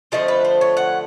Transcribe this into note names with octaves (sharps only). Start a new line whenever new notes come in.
D3 F3 A3 C4 D#5
B4
C5
C#5
F#5